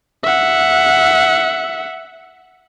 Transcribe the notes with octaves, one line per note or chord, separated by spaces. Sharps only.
E5 F#5